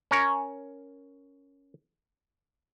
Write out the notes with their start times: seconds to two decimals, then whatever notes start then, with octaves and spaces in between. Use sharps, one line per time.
0.11 C#4 A#4 C#5